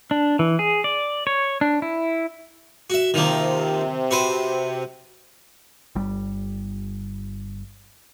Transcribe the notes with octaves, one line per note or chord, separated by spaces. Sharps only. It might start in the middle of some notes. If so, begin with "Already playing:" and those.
D4
E3
G#4
D5
C#5
D4
E4
F#4 E5
C3 D#3 F3 A#3
F#4 B4 C5
G1 G3